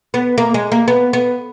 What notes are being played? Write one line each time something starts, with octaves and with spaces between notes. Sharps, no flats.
B3
A#3
G#3
A#3
B3
B3